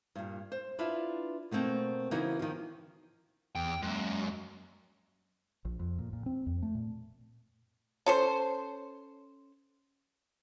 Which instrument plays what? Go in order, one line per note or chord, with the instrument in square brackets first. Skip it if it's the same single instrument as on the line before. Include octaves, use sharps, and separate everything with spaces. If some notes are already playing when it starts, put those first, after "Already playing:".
[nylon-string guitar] G2 A#2
C5
D4 E4 F4 B4 E5
B2 A3 A#3 C4 D#4
C#3 E3 B3 D#4 F#4 A#4
D#3 F3
[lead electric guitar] E2 [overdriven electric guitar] G5
[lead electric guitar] F#2 [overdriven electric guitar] G#3 A#3
[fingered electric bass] A#1
F2
A#2
A#2
C4
F2
A3
A#2
[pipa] C#4 A4 C5